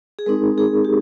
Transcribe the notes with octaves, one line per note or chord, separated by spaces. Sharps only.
G#4
G#3 C4 D#4 A#4
G#4
G4